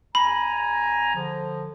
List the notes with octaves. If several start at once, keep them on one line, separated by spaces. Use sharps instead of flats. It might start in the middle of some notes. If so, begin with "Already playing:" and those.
E2 G#5 A#5 B5
D3 F3